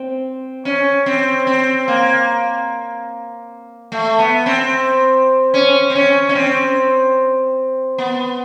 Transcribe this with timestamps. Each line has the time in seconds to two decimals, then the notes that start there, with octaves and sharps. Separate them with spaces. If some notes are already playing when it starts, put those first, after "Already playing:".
Already playing: C4
0.65 C#4
1.06 C4
1.47 C4
1.88 A#3
3.92 A3
4.19 B3
4.46 C4
5.54 C#4
5.90 C4
5.95 C#4
6.29 C#4
6.35 C4
7.98 B3